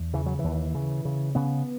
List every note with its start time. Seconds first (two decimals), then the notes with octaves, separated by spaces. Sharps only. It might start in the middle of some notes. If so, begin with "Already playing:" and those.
Already playing: E2
0.14 C#3 E3
0.26 F#3
0.39 E3
0.44 D#2
0.75 C#3
1.05 C#3
1.35 C#3 B3